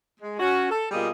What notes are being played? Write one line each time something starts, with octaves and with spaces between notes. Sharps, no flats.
G#3
C#4 F#4
A4
B2 G3 A#3 F4 G#4 D#5